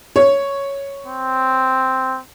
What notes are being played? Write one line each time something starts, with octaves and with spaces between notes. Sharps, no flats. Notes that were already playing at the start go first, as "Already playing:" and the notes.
C#5
C4